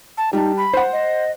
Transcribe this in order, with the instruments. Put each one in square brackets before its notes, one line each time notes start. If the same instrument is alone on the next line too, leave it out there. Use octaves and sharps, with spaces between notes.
[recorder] A5
[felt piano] G3 A5 [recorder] D#4
[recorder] B5
[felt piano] C5 F#5
[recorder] D#5